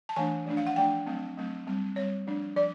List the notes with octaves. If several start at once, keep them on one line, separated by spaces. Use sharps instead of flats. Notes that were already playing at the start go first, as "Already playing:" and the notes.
A5
E3 A3 D4 G#5
F3 A3 D4
F5
F#5
F3 A3 D4 G5
F#3 A3 C4
F#3 A3 C4
G3 C4
G3 C4 C#5
F3 A3 D4
F3 D5